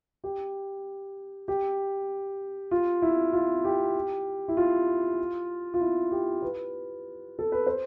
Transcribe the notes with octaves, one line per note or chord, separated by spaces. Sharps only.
G4
G4
F4
E4
F4
G4
E4
F4
F4
E4
G4
B4
A4
B4
C5